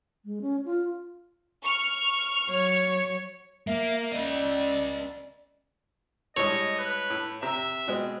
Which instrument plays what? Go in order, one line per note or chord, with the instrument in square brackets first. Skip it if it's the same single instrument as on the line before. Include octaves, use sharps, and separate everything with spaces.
[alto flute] G#3
C#4
F4
[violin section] C#6 F6
[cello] F#3 C#5
[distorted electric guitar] A#3 [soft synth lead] E5
[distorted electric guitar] C#4 D#5 [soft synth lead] D5
[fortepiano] A2 G3 G#3 [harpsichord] C#5 [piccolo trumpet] D#5
[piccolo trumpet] B4
[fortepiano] A2
[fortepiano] C3 A#5 [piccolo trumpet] E5
[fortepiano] B2 G#3 C4